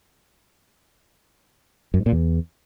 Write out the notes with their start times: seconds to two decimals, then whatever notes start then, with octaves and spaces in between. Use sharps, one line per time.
1.94 F#2
2.00 G#2
2.06 A#2
2.12 E2